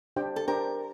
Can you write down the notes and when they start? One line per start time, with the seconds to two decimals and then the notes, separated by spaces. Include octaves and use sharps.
0.16 D4 G4 C5 G5
0.36 A4
0.48 D4 G4 A#4 C5 G5